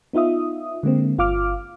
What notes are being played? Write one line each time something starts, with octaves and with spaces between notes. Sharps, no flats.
B3 D#4 F4 E5 D#6
D3 G#3 A#3 C4
G1 F4 F5 D6 F6